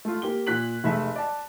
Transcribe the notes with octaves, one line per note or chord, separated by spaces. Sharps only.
A3 F4
A#3 G4 G7
A#2 F#6 B6 F#7
F1 G#3 A3 E5
D5 A5